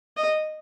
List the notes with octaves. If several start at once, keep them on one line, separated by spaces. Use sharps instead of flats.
D#5